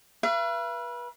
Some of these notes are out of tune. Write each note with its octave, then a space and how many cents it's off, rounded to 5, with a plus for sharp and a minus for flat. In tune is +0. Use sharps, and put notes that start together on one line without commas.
B4 -30 E5 +45